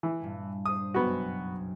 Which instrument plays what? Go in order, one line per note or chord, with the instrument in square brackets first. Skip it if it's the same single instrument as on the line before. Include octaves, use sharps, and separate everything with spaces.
[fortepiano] E3
[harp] G2 A#2 A3
[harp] D4 C5 [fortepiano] D#6
[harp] F#1 B1 F#2 [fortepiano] B3 F#4